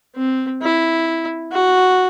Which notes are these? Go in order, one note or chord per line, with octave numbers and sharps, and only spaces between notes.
C4
E4
F#4